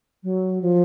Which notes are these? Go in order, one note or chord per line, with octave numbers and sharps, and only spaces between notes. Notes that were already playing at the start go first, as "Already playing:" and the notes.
F#3
F3